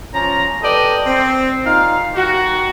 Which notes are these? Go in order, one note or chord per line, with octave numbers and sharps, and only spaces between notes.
F3 C#4 A#5
G4 A4 B4 D5 D#5
C4
A#2 D#4 F5
D#3 F#4